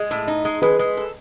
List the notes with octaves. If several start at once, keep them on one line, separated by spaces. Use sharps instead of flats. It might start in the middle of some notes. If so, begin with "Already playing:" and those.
Already playing: G#3
A2
D#4
G#3
G#3 G#4 B4
G#3
A4